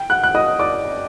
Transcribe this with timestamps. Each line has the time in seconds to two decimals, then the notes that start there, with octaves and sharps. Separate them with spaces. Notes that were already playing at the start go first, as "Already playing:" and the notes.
Already playing: G5
0.10 F#5 F#6
0.23 F#6
0.35 D#5 D#6
0.59 D5 D6